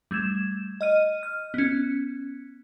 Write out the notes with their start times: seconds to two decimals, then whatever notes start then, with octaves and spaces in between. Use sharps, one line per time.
0.11 G3 A3 G#6 E7
0.81 D#5 F6 D#7
1.23 F6
1.54 B3 C#4